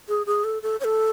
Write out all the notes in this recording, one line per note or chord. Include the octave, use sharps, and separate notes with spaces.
G#4
G#4
A4
A4
C#5
A4